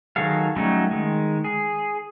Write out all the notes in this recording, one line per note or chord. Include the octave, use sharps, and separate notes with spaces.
D#3 F#3 G#4 A4 F5
F#3 G3 A3 C#4 D#4
D#3 G#3
G#4